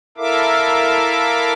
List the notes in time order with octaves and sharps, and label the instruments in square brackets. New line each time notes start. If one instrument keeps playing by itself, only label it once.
[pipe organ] E4 A4 A#4 E5 F5 D6